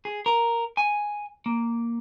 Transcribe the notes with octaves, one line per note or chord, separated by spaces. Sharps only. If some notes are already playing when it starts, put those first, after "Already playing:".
G#4
A#4
G#5
A#3